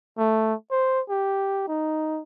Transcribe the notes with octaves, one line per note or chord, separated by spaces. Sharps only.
A3
C5
G4
D#4